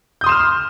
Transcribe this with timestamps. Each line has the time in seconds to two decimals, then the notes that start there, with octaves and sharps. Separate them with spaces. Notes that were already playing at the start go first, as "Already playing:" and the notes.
0.21 G6
0.24 D#6
0.26 C6
0.29 E7
0.32 F6